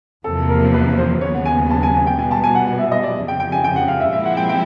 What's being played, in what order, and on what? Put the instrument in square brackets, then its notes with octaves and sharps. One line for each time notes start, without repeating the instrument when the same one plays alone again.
[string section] E2 C3 F3 A#3 [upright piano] A4
[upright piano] A#4
B4
C5
[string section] D#2 C#3 F#3 B3 [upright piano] C#5
[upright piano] F#5
G#5
A5
G#5
G#5
G5
[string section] B2 G3 B3 [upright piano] G#5
[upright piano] A5
G#5
F#5
F#5
E5
D#5
D5
[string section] F2 C#3 F3
[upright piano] G5
G5
G#5
G5
F#5
F5
E5
[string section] A#2 F3 G#3 C4 E4 [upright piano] E5
[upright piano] F#5
G5
G5